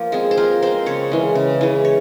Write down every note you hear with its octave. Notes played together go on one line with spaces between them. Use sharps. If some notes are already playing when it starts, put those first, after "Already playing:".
Already playing: F3 A#3 F4
G#3 C4 G#4
C5
F3 A#4
G#3 C4 C5
C#3 C#5
E3 G#3
C#3
E3 G#3
C#5